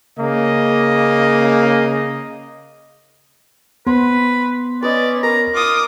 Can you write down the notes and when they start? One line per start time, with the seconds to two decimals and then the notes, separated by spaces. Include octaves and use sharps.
0.19 C#3 A#3 D#5
3.87 B3 B4 C5
4.83 C#4 B4 D5 D#5
5.23 A#4 A#5
5.54 F4 D6 D#6